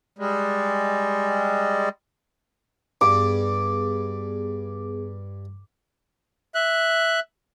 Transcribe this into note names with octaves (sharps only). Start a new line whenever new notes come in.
G3 G#3
G2 B3 G#4 D6
E5 F#6